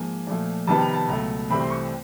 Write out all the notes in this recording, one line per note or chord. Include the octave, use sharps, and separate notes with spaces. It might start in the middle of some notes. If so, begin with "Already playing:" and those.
Already playing: G#2 F3 A#3 G#5
A#2 F3 A3
F2 C3 D#3 G3 B3 A5
A#5
A5
C#2 B2 F#3 A3 A#5
C2 C3 E3 A3 C4 B5
C6
C#6